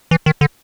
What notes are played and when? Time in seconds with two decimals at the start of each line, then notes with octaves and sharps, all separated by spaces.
0.11 E3
0.26 D#3
0.41 D3